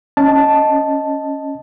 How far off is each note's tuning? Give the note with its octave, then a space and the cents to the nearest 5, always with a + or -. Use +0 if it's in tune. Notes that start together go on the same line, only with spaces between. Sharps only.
C#4 +0 D#5 +0 A5 +0